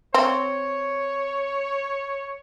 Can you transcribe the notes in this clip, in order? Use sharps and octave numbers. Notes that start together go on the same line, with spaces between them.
C4 C#5